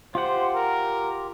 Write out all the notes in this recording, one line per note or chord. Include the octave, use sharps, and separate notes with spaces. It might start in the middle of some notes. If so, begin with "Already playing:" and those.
F4 G4 C5 F#5
A#4